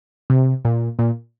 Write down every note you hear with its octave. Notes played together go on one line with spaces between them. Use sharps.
C3
A#2
A#2